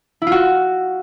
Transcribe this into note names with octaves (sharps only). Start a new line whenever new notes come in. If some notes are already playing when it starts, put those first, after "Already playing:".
E4
F4
F#4